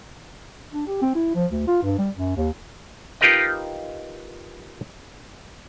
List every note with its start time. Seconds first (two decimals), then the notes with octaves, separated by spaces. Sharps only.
0.73 D4
0.87 G4
1.02 C4
1.15 E4
1.35 F3
1.52 D2
1.67 F4
1.83 G2
1.99 G3
2.17 F#2
2.36 D#2
3.21 D#4 F4 G4 A#4 B4 D#5